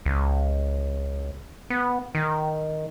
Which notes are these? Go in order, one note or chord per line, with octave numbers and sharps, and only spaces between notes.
C#2
B3
D#3